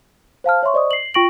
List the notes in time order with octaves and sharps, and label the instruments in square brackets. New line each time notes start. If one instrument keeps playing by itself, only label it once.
[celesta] C5 F5 A5 F6
C#5 E5 C6 C#6
C5 D5 D#5 C#6 D#6
C7 F#7
F4 G5 C#6 A#6 D7 F#7